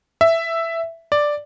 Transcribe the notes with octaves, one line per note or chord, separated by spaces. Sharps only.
E5
D5